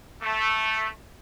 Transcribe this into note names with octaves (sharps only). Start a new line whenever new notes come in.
A3